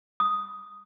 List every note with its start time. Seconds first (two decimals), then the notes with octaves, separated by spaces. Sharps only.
0.20 D#6